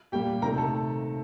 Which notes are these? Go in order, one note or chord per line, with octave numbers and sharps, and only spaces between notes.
A#2 G3 A#3 G4 G5
C3 D#3 A3 A#4 A#5
A4 A5